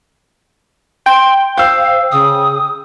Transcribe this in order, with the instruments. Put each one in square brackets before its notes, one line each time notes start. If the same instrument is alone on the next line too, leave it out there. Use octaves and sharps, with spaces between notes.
[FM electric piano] G5 [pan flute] C6
[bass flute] C5 [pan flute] F5 [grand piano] E6 G6
[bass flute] C#3 [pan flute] D#6